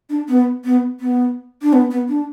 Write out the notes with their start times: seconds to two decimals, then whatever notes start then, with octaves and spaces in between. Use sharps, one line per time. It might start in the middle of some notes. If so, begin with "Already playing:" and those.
0.09 D4
0.29 B3
0.64 B3
1.00 B3
1.62 D4
1.73 B3
1.91 B3
2.08 D4